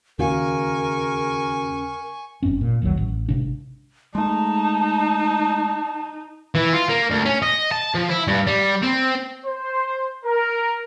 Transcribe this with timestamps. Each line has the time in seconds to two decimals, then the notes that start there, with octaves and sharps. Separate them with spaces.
0.19 D#2 C#3 F#4 A#4 G#5 C#6
2.43 F#1 G2 C4 C#4
2.61 A#2
2.82 F1 C2 D#3 F#3
2.97 A1
3.29 G#1 C3 D4
4.15 G#3 A3 D#4 A5
6.55 E3
6.73 F4
6.90 A#3
7.11 D2
7.26 C#4
7.43 D#5
7.72 A5
7.95 F3
8.09 E4
8.28 G2
8.47 G3
8.83 C4
9.45 C5
10.25 A#4